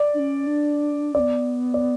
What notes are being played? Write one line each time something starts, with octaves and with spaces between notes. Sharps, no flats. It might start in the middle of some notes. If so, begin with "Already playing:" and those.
Already playing: D5
D4
C#4
D4
B3 C#4 D5
D5